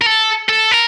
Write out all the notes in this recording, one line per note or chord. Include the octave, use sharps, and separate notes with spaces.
A#4
A4
A4
A#4